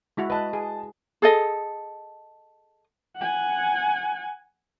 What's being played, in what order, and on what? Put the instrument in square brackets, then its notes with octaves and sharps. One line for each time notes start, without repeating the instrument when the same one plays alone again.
[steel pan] G#3 E4 F#4
[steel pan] B4 [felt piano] D#5 A5
[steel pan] G#4
[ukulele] G#4 A4 D#5
[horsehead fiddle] F#5 G#5